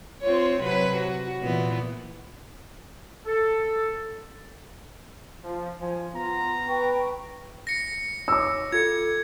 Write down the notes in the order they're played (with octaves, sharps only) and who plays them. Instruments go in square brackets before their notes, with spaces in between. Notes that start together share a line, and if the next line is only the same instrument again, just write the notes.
[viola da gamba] C4 F4 C#5
C3 F#3 B4
F#4
A#2 E3 B3
[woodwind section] A4
[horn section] F3
F3 C5 G#5
[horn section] B3 A#5 [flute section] F4
[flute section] B4 G5 C#6
[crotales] A#6 C#7
[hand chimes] C#5 [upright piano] D6 E6
[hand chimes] F4 A4 C#7 [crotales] G#6